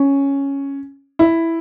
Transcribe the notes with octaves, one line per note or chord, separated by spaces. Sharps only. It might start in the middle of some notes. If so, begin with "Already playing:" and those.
Already playing: C#4
E4